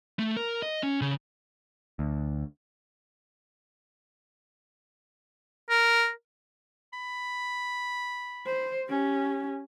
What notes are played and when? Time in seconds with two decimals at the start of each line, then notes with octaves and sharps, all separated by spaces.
0.19 A3
0.37 A#4
0.62 D#5
0.83 C#4
1.02 C#3
1.99 D2
5.70 A#4
6.93 B5
8.46 C5
8.89 C#4 G4